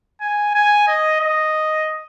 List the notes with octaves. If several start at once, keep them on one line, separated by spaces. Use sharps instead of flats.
G#5
G#5
D#5
D#5